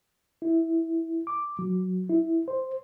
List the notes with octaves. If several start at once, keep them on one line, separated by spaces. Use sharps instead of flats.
E4
D6
F#3
E4
C5